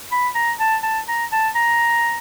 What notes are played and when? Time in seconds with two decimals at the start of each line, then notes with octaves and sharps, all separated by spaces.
0.12 B5
0.35 A#5
0.60 A5
0.83 A5
1.08 A#5
1.32 A5
1.55 A#5